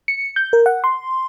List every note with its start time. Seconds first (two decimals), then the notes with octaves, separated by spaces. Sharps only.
0.08 C#7
0.36 G6
0.53 A#4
0.66 F#5
0.84 C6